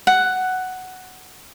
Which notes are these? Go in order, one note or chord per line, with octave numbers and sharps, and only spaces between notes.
F#5